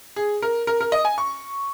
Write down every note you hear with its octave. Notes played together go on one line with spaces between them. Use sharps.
G#4
A#4
A#4
A#4
D#5
G#5
C#6